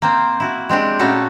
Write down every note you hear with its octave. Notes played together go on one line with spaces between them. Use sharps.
A#3 C4 C5
E4 F#4
G#3 C4 D4 G4
A#2 A3 B3 C#4 F#4 A4